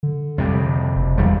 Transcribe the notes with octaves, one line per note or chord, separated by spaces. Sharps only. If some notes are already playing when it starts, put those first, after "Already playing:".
D3
F2 C3 G3
F#1
G1 E2 G3